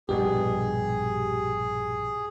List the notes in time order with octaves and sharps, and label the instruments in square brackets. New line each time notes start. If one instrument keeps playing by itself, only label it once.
[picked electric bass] A#1 G2 B2 [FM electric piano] G4 [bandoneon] G#4